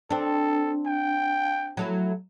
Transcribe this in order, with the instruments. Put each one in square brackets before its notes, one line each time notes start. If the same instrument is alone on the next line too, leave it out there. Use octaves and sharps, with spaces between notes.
[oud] C4 D4 [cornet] A4
[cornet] G5
[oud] F#3 A3 E4